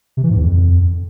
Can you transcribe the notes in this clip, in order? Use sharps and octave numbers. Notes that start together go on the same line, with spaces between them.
C3
E3
G#2
E2
F2